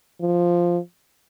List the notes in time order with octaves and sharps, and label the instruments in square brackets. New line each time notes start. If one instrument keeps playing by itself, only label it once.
[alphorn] F3